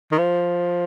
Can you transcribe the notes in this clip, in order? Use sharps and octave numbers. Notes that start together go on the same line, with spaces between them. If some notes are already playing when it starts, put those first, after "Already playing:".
D#3
F3